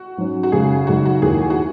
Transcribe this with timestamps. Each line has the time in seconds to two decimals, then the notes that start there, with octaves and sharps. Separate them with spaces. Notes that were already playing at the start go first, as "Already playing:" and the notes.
Already playing: F#4
0.17 G#2 F#3 C#4
0.43 F#4
0.52 F#2 C#3 G#3 G#4
0.87 F#2 C#3 G#3 D#4 F#4
1.05 F#4
1.22 D#2 D#3 A#3 E4 G#4
1.50 F#4